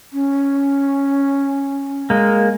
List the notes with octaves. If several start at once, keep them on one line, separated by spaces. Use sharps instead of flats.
C#4
G#3 A#3